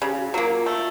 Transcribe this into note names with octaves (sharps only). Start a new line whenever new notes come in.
C#3 G4
F#4
F#3 A#3 F4
F4
A3